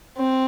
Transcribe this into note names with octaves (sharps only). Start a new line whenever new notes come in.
C4